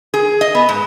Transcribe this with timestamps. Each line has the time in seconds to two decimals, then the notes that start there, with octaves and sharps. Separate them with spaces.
0.14 G#4
0.41 D#5
0.55 B3
0.69 G#2